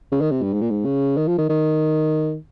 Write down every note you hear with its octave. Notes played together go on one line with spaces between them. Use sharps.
C#3
D#3
C3
G2
G#2
A#2
G#2
C#3
D#3
F3
D#3
D#3